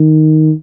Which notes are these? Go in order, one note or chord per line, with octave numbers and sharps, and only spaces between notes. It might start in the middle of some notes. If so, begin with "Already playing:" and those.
Already playing: D#3